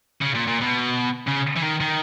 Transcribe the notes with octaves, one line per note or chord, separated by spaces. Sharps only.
C#3
A#2
A#2
B2
C#3
E3
D#3
D#3